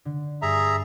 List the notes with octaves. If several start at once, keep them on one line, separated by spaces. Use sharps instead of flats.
D3
G2 G#4 E5 A#5
A5 B5